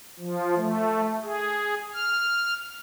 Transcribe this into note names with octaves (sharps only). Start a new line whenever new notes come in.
F3
A3
G#4
F6